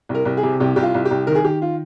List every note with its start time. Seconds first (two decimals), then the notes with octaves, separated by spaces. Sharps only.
0.09 C2
0.15 A#4
0.25 C2
0.37 G#4
0.43 C3
0.60 C2 G4
0.76 C2 G4
0.82 F4
0.94 C2
1.05 G4
1.11 C2
1.27 D#3 A#4
1.35 G#4
1.44 D#3 G4
1.62 F4